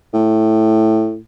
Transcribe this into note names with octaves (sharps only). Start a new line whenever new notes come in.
A2